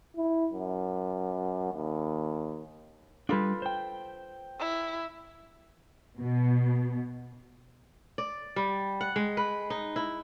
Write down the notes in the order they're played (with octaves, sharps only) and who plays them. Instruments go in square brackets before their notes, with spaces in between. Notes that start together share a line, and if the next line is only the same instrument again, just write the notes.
[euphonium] E4
F#2
D#2
[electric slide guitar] G3 D4 [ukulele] F4 A4 B4
[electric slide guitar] C5 G5
[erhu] E4
[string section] B2
[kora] D5
G3
F#5
G#3
B4
D#4
E4